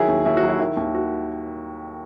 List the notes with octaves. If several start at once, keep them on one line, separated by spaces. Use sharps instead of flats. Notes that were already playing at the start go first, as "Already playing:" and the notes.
Already playing: D#3 F#3 E4 G#4
D#2
D#2 E4
F#4
F#3
E4
D#3 E4
D#2
F#4